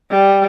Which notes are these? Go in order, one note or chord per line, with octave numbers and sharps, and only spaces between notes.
G3